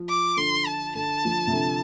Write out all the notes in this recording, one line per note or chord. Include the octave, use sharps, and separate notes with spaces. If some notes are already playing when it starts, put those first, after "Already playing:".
Already playing: F3
D6
D3 C6
A5
D3 A5
F3
C3
D3